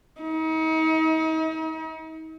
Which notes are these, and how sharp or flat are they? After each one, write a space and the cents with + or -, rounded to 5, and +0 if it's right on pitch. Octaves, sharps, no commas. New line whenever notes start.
D#4 +40